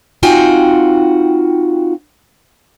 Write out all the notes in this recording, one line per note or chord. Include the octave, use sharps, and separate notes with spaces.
C4 D#4 F4 F#4 G5 G#5